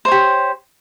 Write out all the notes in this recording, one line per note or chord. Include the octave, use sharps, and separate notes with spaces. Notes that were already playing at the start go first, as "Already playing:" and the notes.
G4 C5 C#5